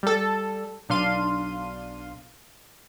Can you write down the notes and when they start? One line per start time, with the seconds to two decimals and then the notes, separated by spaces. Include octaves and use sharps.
0.03 G3 A4
0.89 B1 D4 F5 C6 D#7